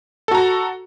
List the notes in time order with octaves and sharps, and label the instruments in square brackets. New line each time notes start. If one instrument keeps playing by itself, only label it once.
[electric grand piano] A4
F#4
A#5